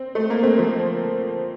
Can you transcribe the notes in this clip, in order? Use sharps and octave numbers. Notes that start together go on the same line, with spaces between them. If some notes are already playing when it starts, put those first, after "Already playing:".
Already playing: C4
A3
A#3
A3 C4
F3 A3